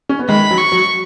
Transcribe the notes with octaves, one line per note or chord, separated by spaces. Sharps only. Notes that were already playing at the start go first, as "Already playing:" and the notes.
C#4
B3
D#3 G#3 B5
F#3
C#6
F#3